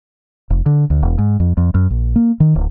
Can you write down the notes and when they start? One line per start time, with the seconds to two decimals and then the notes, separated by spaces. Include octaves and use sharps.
0.50 F1
0.66 D3
0.90 D2
1.03 E1
1.18 G#2
1.40 F2
1.57 F2
1.74 F#2
1.90 A#1
2.16 A#3
2.40 D#3
2.55 D1